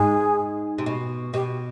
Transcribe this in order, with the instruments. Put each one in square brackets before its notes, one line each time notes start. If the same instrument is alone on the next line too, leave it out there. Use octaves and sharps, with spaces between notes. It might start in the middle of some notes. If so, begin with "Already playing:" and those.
Already playing: [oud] G#2 [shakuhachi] G#4
[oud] C3
B2
[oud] B2 [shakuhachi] G4